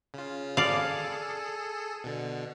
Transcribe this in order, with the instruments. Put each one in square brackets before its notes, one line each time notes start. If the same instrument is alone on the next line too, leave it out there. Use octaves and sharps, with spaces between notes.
[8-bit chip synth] C#3 F4
[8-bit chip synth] G#4 A4 [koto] D5 F5
[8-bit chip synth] B2 D3